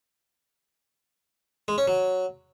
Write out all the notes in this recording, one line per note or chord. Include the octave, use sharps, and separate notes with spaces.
G#3
C#4
F#3